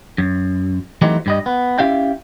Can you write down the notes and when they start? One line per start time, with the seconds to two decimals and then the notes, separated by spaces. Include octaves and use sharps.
0.18 F#2
1.02 E3 F#3 A3 C4 D#4 G4
1.26 G2 G3 D#5
1.46 B3
1.78 C#4 E4 G4 E5 F5 G5